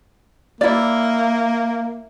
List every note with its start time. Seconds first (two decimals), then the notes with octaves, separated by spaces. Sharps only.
0.61 A#3 E4 D5